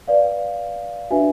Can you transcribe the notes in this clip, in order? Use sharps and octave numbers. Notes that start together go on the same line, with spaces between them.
B4 D5 F5
D4 F#4 B4 E5 G#5